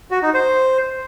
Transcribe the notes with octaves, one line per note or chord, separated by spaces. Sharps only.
F#4
D#4
C5